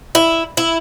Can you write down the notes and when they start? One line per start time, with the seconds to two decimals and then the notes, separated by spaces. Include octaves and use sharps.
0.15 E4
0.57 E4